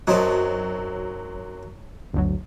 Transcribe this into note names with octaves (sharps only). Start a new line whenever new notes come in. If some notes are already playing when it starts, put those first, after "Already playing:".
F#2 F#3 C4 D#4 C#5 A5
G1 D2 F#3